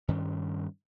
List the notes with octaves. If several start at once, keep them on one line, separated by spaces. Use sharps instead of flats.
G2 D#3 C#4